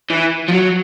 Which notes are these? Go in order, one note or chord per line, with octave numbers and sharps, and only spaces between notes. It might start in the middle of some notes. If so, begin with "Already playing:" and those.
E3
F3
F#3